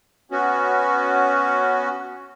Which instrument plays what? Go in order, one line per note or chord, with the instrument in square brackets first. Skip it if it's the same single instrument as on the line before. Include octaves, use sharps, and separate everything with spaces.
[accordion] B3 C#4 F#4